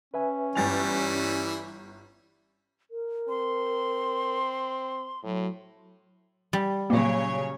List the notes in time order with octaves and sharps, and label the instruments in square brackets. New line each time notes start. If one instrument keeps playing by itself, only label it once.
[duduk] C#4 [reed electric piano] B4 E5 G#5
[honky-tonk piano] G1 A6 F7 [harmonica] E3 G3 E4 [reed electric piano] G#5
[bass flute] A#4
[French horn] C4 [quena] C6
[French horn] A2 [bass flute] F#3
[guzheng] G3
[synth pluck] A#2 A#3 [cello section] C#3 F#3 C#5